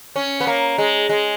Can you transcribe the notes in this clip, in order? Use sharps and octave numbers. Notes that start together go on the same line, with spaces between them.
C#4
B3
A#3
G#3
G#3